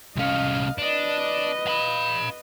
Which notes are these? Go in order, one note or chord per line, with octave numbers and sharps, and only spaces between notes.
C2 C#4 D#5 F5
D4 B4 D#5
F5 B5